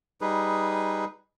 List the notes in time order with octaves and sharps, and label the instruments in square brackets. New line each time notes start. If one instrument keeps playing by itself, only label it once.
[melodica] G3 D#4 G#4 B4